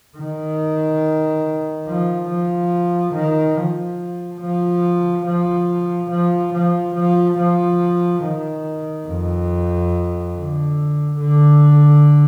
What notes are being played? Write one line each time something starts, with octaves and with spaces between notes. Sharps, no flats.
D#3
F3
F3
D#3
F3
F3
F3
F3
F3
F3
F3
D#3
F2
D3
D3